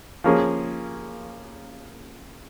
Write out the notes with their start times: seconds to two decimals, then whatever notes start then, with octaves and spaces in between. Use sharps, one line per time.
0.24 F3 A#3 C#4 G#4